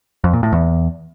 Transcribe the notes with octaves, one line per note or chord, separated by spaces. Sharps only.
F2
A#2
A2
E2